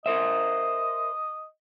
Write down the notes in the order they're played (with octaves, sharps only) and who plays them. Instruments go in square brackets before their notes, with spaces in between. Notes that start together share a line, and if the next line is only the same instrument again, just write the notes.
[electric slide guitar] A#4 C5 E5 [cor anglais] D#5